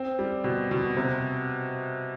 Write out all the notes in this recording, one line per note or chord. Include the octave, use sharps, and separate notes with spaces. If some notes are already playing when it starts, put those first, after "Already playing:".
Already playing: C4
G3
B2
B2
C3